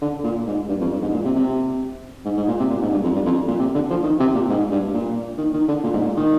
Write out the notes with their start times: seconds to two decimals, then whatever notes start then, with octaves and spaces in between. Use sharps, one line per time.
0.02 D3
0.24 A#2
0.47 G#2
0.69 G2
0.81 F2
0.92 G2
1.02 G#2
1.14 A#2
1.25 C3
1.36 C3
2.25 G#2
2.37 G#2
2.48 A#2
2.60 C3
2.70 A#2
2.82 G#2
2.92 G2
3.04 F2
3.15 G2
3.26 F2
3.49 A#2
3.59 C3
3.75 D3
3.90 F3
4.04 D#3
4.20 C3
4.34 A#2
4.50 G#2
4.71 G2
4.94 A#2
5.38 D#3
5.54 D#3
5.68 D3
5.84 A#2
5.94 G#2
6.05 A#2
6.17 D#3